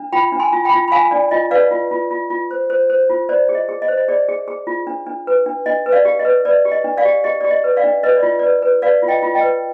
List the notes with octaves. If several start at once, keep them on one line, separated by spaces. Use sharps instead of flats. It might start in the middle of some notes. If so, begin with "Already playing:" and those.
Already playing: D4
F4 G5 B5
D4
G#5 C6
F4
G5 B5
F4
B5
F4 F5 G#5
D4 D5
F4 D#5
B4 D5 F5
F4
F4
F4
F4
C5
C5
C5
F4
C5 D5
G#4
D#5
G#4
D#5
C5
D#5
G#4 D5
G#4
G#4
F4
D4
D4
B4
D4
D4 D#5
B4
D5 F5
G4
D#5
B4
B4 D5
G4
D#5
D4
D5 F5
G4
G4 D#5
G4 D5
D#5
B4
D5 F5
D4
B4 D#5
D5
F4
B4 D5
B4
B4 D5 F5
F4
D#5 G5
F4
D#5 G5
B4